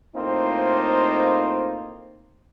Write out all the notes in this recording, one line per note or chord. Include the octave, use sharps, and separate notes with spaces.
A2 A#3 C4 D#4 F4 C5